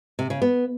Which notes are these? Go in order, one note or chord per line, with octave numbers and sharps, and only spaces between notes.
C3
C#3
B3